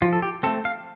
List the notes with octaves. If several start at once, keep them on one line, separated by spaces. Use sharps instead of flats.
F3 F4
A4
G4
A3 C4 A4
F5